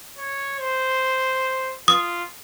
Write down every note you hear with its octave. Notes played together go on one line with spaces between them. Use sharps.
C#5
C5
F4 D#6